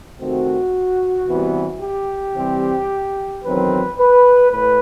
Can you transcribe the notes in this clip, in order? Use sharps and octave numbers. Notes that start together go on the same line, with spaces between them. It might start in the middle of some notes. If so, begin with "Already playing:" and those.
C3 D#3 A3 C4 F#4
C3 E3 G3 B3
G4
C3 E3 G3 C4
E2 D#3 F#3 C4 B4
B4
A2 B4